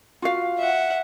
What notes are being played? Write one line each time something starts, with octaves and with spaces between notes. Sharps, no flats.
F4 F#4 F5
E5 F#5